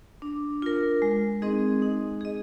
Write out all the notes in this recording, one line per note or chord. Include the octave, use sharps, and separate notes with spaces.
D4
F4 A#4
G#3
C4 D#4 G#4 D#5
D#4
G#4 D#5